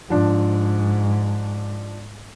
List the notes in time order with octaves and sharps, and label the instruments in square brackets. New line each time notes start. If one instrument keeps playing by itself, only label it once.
[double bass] G#2 [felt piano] F3 D4